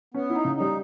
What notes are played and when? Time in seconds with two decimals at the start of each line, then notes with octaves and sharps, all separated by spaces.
0.14 B3 C#4
0.30 D#4 E4
0.45 C#3
0.56 G3 D#4